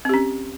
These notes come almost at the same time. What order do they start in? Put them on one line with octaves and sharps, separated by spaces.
C4 G4 C#4